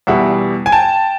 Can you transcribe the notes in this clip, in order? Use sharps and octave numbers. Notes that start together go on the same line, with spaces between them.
E2 B2 G3 E5 F#5
G#5
G5 A5